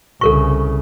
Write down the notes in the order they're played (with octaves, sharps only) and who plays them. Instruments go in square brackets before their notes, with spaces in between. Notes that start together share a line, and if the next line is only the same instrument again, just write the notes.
[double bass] C2 C#3 [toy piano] A4 A#4 C#6